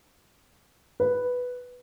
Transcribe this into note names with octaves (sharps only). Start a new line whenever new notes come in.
B4